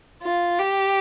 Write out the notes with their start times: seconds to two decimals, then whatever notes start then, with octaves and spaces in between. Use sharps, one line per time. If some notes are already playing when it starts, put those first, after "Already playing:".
0.23 F4
0.59 G4